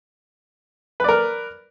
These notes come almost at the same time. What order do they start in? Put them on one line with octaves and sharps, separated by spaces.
B4 D5 A#4